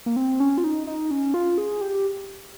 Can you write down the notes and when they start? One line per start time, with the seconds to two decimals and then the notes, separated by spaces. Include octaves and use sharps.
0.06 A#3
0.16 C4
0.40 C#4
0.58 F4
0.64 D#4
0.87 D#4
1.11 C#4
1.34 F4
1.58 G#4
1.81 G4